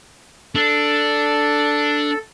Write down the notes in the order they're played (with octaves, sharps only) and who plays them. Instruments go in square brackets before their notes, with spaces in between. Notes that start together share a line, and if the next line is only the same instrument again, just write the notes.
[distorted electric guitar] D4 [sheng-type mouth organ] A4